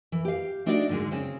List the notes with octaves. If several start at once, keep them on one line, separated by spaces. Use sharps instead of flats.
E3
G4 F5
A3 D4 D#4 F#4 B4 D5
G#2 D3 G#3
C#3 C4 C#4